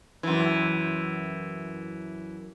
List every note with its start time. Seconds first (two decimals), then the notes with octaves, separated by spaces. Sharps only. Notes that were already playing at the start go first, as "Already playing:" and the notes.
0.23 F#2 E3